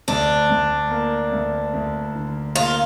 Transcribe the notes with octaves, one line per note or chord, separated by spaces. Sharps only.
D2 D4
D2
A#3
D2
D2
D3
A#3 F4